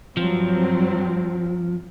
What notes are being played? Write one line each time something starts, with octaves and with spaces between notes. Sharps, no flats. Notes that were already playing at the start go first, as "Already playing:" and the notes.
G2 F3 F#3 C4